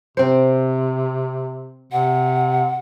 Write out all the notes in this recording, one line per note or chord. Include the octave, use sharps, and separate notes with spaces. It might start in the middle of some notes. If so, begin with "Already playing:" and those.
C3 C4 C5
C3 F#5